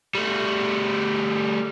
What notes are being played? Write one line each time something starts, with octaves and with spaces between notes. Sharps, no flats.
G3 A3